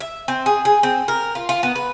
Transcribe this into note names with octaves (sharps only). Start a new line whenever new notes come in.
E5
C4
G#4
G#4
C4
A#4
F4
F4
B3
B4